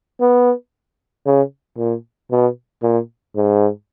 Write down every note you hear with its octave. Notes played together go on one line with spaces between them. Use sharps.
B3
C#3
A#2
B2
A#2
G#2